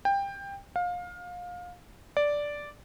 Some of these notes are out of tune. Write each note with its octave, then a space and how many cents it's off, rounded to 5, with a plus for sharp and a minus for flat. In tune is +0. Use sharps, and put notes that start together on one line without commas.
G5 +20
F5 +25
D5 -5